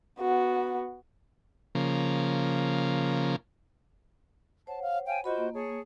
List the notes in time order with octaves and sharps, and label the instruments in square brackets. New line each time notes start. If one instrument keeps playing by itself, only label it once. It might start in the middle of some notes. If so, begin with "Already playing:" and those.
[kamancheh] B3 F#4
[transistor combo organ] C#3 F3 A#3
[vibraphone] C5 C#5 F#5 [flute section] A5
[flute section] F5
F5 G5 G#5
[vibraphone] F4 D#5 B5 [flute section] F#4 C5
[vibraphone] A#3
[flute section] G#4 C#5 A5